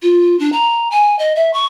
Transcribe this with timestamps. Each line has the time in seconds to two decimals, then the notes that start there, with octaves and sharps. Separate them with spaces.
0.02 F4
0.39 D4
0.52 A#5
0.91 G#5
1.19 D#5
1.36 E5
1.53 C#6